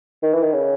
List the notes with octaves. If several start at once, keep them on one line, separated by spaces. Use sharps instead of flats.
D#3
E3
D#3
C#3